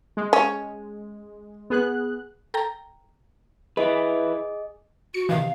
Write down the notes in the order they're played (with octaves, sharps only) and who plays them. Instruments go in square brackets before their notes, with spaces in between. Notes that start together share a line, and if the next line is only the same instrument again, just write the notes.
[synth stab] G#3
[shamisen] C#4
[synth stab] B3 G#4 F#6
[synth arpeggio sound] A4 G5 A#5
[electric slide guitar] E4 B4 [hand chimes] G#4 D#5
[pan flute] F#4 [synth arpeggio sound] C#7
[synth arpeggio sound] C3 D#3 E3 [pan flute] F5